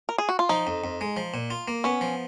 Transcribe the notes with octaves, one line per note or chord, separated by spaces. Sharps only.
A#4
G#4
F#4
F4
F3 D#4
F2
F2
G#3
F3
A#2
F4
A#3
B3 C#4
F3